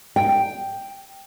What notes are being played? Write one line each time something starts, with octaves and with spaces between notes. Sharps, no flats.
G5